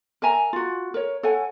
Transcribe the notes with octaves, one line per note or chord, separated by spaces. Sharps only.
A#4 E5 G#5 A#5
F4 F#4
A#4 C#5
A4 C#5 F#5 G#5